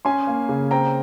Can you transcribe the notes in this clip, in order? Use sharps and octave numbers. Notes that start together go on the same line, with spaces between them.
C#4 G#5 C6
A#3
C#3
C4 G5 A#5